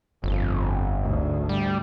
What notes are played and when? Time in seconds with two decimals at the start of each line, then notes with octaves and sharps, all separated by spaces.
0.24 G1 F2
1.02 D2 G#2
1.49 G3